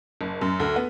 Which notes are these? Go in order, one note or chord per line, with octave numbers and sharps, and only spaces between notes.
F#1
F#2
D2
B3